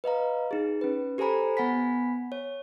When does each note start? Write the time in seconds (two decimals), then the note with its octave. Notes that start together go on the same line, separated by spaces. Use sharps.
0.04 B4 D#5 F5 A#5
0.51 D#4 G#4
0.81 C#4 B4
1.18 G4 A4 C5 G#5 A#5 B5
1.57 B3 F#5 G#5 B5 B6
2.32 C#5